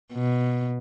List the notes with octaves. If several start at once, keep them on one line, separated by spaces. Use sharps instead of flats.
B2